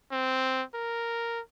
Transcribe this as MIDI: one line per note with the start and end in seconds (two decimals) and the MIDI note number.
0.12 0.63 60
0.75 1.40 70